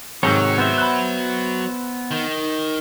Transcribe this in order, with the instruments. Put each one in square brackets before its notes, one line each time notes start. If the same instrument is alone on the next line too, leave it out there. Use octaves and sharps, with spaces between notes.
[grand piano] G#2 C3 D#3 [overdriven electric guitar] F#3 [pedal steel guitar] C#5
[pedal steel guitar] B3 C5 E5
[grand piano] B5 F#6
[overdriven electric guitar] D#3